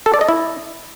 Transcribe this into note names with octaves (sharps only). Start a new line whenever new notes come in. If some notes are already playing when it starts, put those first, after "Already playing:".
A4
D5
D#5
E4